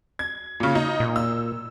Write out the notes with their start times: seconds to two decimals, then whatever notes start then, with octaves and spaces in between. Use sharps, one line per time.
0.19 G#6
0.60 A#2 C#3
0.75 D#4
1.00 A#2
1.16 E6